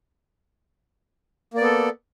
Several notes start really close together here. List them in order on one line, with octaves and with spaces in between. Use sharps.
A#3 D5 B3 A4